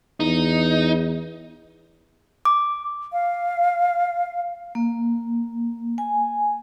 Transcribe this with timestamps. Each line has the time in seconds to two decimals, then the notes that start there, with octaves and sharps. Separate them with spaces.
0.20 E2 D#4
2.45 D6
3.13 F5
4.75 A#3
5.98 G#5